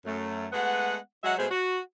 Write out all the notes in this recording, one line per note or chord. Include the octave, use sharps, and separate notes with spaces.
F#2 A3
G#3 A3 B3 F#5
F#3 G#3 F#4 D#5 E5 F#5
B2 G#3 A3 G#4 C5
F#4